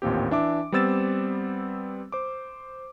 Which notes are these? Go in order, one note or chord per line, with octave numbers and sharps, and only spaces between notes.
A1 D#2 A#2 C4 G4
E3 D4 E5 D6
G3 B3 C4 E6 A6 E7
C5 D6